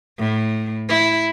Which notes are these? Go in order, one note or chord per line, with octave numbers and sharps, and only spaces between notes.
A2
E4